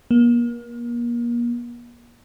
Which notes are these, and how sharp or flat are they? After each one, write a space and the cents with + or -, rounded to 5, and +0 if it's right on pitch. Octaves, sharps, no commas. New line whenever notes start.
A#3 +35